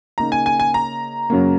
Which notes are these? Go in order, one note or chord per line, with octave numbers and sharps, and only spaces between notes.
C#3 A#3 D#4 A#5
G#5
G#5
G#5
A#5
F#2 C#3 F#3 A#3